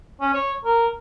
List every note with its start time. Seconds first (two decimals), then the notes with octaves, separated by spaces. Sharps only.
0.21 C#4
0.34 C#5
0.65 A#4